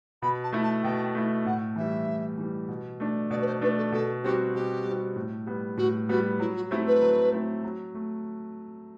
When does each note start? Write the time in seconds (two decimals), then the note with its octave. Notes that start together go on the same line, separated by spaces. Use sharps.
0.22 B2 B5
0.43 A5
0.53 A3 E4
0.63 A5
0.83 B2 G5
1.15 A3 E4
1.45 A2 F#5
1.76 E3 G3 E5
2.08 A2
2.38 E3 G3
2.69 B2
3.00 A3 D4
3.30 B2 D5
3.41 B4
3.46 C5
3.61 A3 D4 B4
3.77 A4
3.92 B2 A4
4.23 G3 C4 F#4 G4
4.54 B2 G4
4.85 G3 C4 F#4
5.16 A2
5.46 G3 B3
5.77 A2 F#4
6.09 G3 B3 F#4
6.40 F#3 E4
6.56 F#4
6.70 A3 C4 E4 G4
6.86 B4
7.02 F#3
7.32 A3 C4 E4
7.64 F#3
7.95 A3